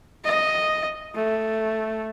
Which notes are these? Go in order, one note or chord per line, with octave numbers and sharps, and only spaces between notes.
D#5
A3